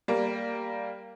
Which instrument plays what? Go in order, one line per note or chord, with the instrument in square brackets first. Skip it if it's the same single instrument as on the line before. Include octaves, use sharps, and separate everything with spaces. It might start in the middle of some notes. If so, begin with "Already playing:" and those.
[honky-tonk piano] G3 A#3